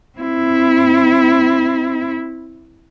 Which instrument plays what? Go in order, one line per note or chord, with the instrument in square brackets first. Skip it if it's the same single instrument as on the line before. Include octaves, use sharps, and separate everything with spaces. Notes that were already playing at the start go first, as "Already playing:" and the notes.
[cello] C4 E4